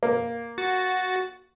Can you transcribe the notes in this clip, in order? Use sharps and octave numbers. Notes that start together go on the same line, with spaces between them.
A#3
F#4 A6